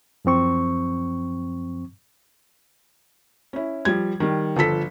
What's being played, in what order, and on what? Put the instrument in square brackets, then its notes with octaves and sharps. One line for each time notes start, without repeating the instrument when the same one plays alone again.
[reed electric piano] F#2 F3 C4 C#6
[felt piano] C#4 E4
F3 G3 G#6
D#3 G3
G1 F3 A4 B6